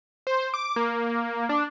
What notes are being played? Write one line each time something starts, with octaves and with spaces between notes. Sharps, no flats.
C5
D6
A#3
D4